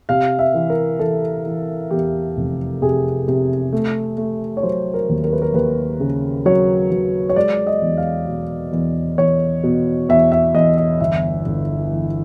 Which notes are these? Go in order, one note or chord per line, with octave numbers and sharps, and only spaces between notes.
C3 F5
E5
E3
A#4
E3 A4
E3
E2 G4
F1
C3 G#4
C3
A3
A3
C#5
F#3 C5
A#4
D#2
A#4
B4
A#4
D#2 B4
C#3
F#3 C#5
F#3
C#5
G#3 D5
D#5
E2
F5
B2
E2
E2 C#5
B2
E2 E5
E5
E2 D#5
D#5
G1 E5
G1
E3